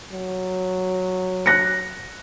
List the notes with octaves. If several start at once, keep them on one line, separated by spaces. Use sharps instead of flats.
F#3
F#6 A#6 C#7